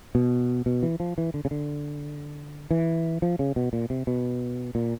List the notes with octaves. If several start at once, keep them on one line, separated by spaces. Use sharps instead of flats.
B2
B2
E3
F3
E3
D3
C#3
D3
E3
F3
C#3
B2
A#2
C3
B2
A#2